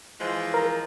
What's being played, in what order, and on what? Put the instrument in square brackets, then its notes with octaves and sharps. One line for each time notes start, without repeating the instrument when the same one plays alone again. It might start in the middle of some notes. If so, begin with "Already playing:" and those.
[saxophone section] E3 F3 G#3
[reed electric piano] A#4